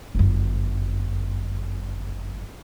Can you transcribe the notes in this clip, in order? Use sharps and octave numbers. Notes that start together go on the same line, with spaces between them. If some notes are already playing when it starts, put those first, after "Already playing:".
G1 F#2